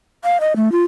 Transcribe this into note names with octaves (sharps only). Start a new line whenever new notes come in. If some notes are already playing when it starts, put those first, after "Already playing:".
F5
D#5
A3
F4